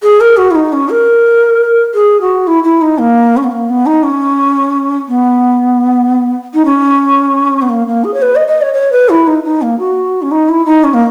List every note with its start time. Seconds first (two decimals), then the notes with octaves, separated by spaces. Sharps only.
0.02 G#4
0.20 A#4
0.37 F#4
0.51 E4
0.55 D#4
0.72 C#4
0.89 A#4
1.94 G#4
2.21 F#4
2.47 E4
2.63 E4
2.81 D#4
2.98 A#3
3.37 C#4
3.43 B3
3.51 A#3
3.69 B3
3.86 D#4
4.03 C#4
5.08 B3
6.54 D#4
6.65 C#4
7.61 B3
7.69 A#3
7.87 A#3
8.04 G#4
8.14 C#5
8.22 B4
8.35 D#5
8.47 D#5
8.61 C#5
8.74 C#5
8.92 B4
9.09 E4
9.27 D#4
9.44 D#4
9.62 A#3
9.79 F#4
10.22 C#4
10.31 D#4
10.49 E4
10.65 D#4
10.83 C#4
10.93 A#3